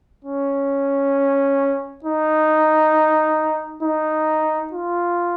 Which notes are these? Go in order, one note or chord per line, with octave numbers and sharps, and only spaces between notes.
C#4
D#4
D#4
F4